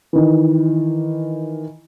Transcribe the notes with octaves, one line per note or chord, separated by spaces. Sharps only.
D#3 E3